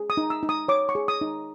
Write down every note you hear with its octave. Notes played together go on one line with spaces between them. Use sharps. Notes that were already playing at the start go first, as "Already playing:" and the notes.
Already playing: G#4
D#6
D#4
E6
D#4
D#6
C#5 D6
C#6
G#4
D#6
D#4